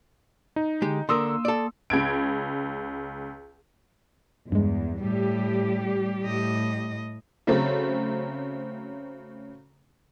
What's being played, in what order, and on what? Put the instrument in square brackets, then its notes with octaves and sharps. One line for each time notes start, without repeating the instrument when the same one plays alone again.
[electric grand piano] D#4
[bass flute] D3 [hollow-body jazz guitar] G#3 G4
[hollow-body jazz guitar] D3 A#4 [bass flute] A#3 [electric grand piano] C6 D#6 E6
[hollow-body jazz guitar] A4 D5
[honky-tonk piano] C#2 G#6 D7
[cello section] E2 [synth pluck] G2 G#3
[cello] A2 [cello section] G3 G4
[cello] A2 D#5
[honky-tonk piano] C#3 F#3 A3 C4